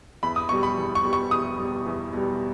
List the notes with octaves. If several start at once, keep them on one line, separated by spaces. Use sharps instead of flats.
E2 B5
D#6
B2 G3 C#6
B5
E2
C#6
B2 G3
C#6
E2 D#6
B2 G3
E2
B2 G3